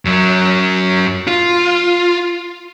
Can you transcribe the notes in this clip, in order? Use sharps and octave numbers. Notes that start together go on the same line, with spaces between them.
F#2 F#3
F4